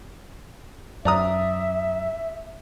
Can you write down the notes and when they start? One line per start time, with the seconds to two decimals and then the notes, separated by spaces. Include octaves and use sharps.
1.05 F#2 D5 E5 A#5 D#6